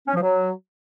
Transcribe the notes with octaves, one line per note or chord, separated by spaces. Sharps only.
C#4
F3
F#3